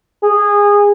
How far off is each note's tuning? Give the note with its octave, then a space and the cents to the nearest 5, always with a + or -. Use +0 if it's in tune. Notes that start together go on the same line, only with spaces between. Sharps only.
G#4 -20